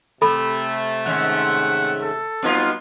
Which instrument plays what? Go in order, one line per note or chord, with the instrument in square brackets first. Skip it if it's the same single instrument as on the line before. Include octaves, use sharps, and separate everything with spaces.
[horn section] C3 A3 [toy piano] A4 B5
[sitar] G#2 D#3 C#4 [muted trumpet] F#5
[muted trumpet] A4
[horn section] F#3 G3 B3 [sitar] C4 D#4 F4